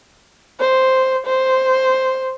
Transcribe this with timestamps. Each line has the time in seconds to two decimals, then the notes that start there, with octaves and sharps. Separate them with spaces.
0.60 C5
1.26 C5